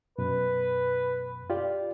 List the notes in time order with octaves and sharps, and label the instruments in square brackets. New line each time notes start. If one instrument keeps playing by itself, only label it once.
[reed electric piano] F#2 B2 [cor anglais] B4
[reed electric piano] F4 G4 D5